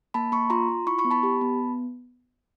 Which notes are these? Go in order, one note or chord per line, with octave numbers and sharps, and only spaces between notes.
A#3 A5 B5
A#3 B5 C#6
F4 A#5 C6
F4
E4 B5 C#6
B5 C#6
B3
A5 B5
G4
B3